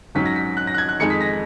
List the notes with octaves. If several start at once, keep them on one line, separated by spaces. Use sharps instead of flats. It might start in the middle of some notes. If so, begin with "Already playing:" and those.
G#2 F#3 C#4 B6
A#6
B6
F#6
A#6
F#6
G#6
F#6
F2 D#3 G#3 D#4 C#7
B6
A#6